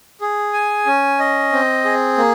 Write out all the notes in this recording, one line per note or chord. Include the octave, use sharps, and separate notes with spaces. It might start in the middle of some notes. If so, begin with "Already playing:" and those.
G#4
G#5
C#4
D#5
C4
G#4
A#3